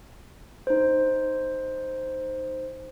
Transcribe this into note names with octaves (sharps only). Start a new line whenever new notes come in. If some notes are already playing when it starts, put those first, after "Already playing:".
D#4 C5